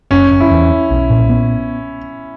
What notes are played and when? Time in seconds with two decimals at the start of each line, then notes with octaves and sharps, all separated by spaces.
0.11 F#1 C#4
0.31 F#1
0.41 E4
0.51 E2
0.71 C#4
0.90 B1
1.10 A#2
1.30 B3